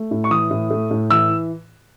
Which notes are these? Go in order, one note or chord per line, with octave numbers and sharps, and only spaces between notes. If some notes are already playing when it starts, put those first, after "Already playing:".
Already playing: A3
A2
C#6
E3 D#6
A2
A3
A2
E3 E6